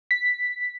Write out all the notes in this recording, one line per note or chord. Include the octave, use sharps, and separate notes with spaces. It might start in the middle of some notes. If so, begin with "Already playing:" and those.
B6